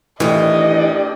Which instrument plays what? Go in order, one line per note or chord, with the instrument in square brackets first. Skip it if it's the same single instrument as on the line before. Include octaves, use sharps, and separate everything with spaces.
[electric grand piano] A2 [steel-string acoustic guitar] D#3 E3 [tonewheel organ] D4 G4 [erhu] D#5